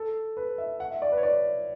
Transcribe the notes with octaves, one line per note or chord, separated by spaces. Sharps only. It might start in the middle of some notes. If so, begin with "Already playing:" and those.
Already playing: A4
B4
E5
F#5
E5
D5
B4
C#5
D5